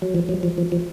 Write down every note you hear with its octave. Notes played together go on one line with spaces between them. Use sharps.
F#3
F3
F#3
F3
F3
F3